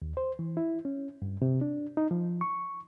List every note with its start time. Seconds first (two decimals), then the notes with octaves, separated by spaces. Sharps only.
0.02 D#2
0.17 C5
0.39 E3
0.57 E4
0.85 C#4
1.22 G2
1.42 C3
1.61 D4
1.97 D#4
2.11 F3
2.41 C#6